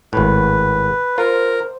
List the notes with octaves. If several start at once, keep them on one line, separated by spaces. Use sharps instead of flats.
G#1 A2 B4
F4 A#4 C5